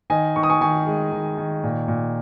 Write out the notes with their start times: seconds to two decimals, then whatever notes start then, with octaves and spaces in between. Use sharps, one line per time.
0.10 D#3 D#5 G#5
0.36 D#3 C#6
0.43 D#6
0.50 G#5 C#6
0.61 D#3 G#5 C#6
0.87 G#3
1.12 D#3
1.38 D#3
1.63 A#2
1.88 A#2